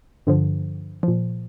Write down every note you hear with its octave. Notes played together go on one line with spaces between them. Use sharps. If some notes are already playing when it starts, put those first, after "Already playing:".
G2 D3 F3
A#2 F3